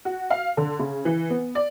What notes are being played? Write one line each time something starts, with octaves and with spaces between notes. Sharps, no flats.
F#4
F5
D3
C#3
E3
B3
D5